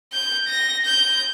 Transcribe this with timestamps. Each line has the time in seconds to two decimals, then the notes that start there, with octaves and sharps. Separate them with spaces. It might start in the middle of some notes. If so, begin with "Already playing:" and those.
0.12 G6
0.47 A#6
0.85 G6